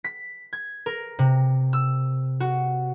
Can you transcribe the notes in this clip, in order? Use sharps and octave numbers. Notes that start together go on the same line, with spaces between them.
B6
G#6
A#4
C3
E6
F#4